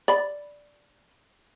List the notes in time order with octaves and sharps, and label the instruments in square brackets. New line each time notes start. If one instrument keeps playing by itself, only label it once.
[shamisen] D5 B5